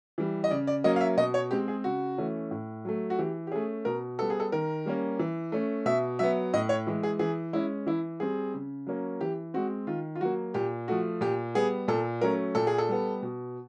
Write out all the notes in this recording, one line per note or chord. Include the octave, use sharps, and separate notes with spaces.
E3 G3
D#5
C#3 D5
D5
F#3 A#3 C#4 D#5
F5
E5
B2 D#5
C#5
G#3 C4 G4
G#4
C#3 F#4
E3 A3 C#4
A2
F#3 A3
F#4
E3 G4
G4
A3 C#4 G#4
B2 A#4
G3 B3 A4
G#4
A4
D#3 A#4
G3 A#3 C#4
E3
A3 C#4
B2 E5
F#3 B3 E5
A2 D#5
C#5
E3 G#3
G#4
E3 G#4
G#3 C#4 E4
E3 E4
G3 C4 G#4
C#3
F#3 A#3 C#4
E3 G4
G#3 C4 F#4
D#3 F4
F4
F#3 A#3 F#4
A#2 G4
F3 A3 F#4
A#2 G4
G3 B3 G#4
A#2 A4
F#3 A3 C#4 A#4
A#2 A4
G#4
A4
G3 B3
B2